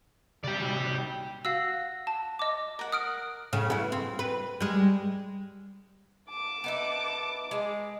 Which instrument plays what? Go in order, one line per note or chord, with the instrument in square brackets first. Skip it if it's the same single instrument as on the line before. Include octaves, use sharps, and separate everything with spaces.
[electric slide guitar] C#3 G4 [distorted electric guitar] D5 G5
[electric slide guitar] C3 D#4 F#4
[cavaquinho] F#4 [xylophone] F5 E6
[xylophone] A5
D#5 D6
[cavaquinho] A#4 F#5
[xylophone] D#6 F6 D7
[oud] A2 C#3
B3 E4
C4
B4
G3 G#3
[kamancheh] A5 D6
[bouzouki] B3 D#4 E4
G#3